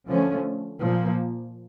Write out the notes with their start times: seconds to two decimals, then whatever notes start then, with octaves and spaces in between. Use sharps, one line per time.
0.09 D3 F3 A3 C#4
0.82 A#2 F3 A#3